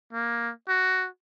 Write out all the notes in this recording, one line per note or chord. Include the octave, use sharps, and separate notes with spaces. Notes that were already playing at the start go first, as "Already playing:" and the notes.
A#3
F#4